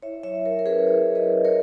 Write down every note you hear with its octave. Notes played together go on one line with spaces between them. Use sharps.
E4 C#5 E5
F#3 C#5 E5
F#3 A#4 C#5
A#4
C#4 G#4 B4
E4 A#4 C#5
F#3
B4 D#5
F#3
A#4 C#5